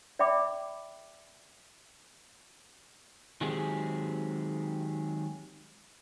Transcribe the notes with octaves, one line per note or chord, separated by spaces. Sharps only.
D5 E5 G5 B5 D6
D#3 F#3 G#3 C4 G4 G#4